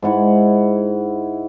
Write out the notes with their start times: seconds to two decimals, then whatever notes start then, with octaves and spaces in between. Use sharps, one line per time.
0.02 G#2 E4 F#5 B5